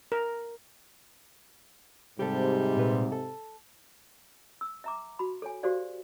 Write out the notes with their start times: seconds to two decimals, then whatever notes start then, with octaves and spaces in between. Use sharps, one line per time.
0.12 A#4
2.19 G#2 C3 G3 G4 A4
2.76 A#2 B4
3.12 A4
4.61 E6
4.84 E5 A#5 D6
5.19 F#4 B5
5.42 A4 C#5 G#5
5.63 F#4 G4 A4 C5 D5 F5